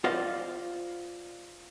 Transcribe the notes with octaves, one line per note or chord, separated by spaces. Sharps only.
F4 C5 D5 D#5 F5